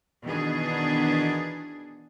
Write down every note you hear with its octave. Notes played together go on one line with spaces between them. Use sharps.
B2 D#3 E3 B3 D4 G#4